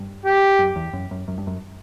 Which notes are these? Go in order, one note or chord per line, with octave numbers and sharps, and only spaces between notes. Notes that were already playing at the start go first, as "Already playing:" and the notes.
Already playing: G2
G4
F#2
E2
F#2
F#2
F#2
G2
F#2